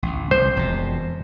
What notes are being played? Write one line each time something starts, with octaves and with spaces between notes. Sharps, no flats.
A1 D2
C2 C5
E1 F2 B2